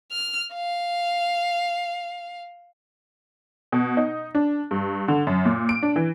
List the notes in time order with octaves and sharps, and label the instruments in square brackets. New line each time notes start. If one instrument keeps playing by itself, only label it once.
[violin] F6
F5
[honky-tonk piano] B2
D#4
D4
G2
D3
F#2
A#2
D7
D4
E3